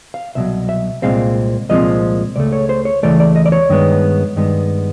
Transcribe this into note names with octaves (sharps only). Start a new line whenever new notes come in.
F5
C2 B2 F#3 E5
E5
C2 A#2 F3 G#3 C4 F5
C2 A#2 F3 G#3 C4 D#5
C#2 C#3 A3 D5
C#5
C5
C#5
C#2 C#3 E3 A3 D5
D5
D#5
D5
C#5
G2 D#3 G#3 B3
G2 D#3 G#3 B3